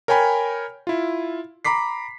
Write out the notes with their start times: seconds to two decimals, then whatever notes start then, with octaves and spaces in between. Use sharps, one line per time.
0.08 A#4 C#5 G5 G#5 B5
0.87 E4 F4
1.65 A#5 B5 D6 B6 C7